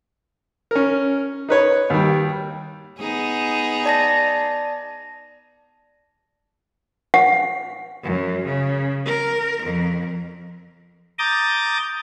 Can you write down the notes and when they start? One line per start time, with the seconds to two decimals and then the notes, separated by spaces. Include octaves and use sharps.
0.71 C#4 A#4
1.49 D#4 B4 C#5
1.90 D#2 G3
2.98 B3 D#4 G#4
3.86 D5 A5 A#6
7.14 F#5
8.04 F#2
8.45 C#3
9.06 A#4
9.63 F2
11.19 A#5 D6 D#6 G6 A6